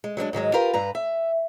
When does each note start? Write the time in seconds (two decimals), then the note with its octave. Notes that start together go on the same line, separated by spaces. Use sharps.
0.04 G#3
0.17 F#3 G#3 C4 D4
0.33 G#2 D#3 F#3 G#3
0.53 F4 G4 A#4 B4 F5
0.73 G2 B4 A#5
0.95 E5